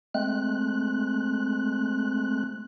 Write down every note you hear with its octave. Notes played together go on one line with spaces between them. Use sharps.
G#3 A3 C4 F#6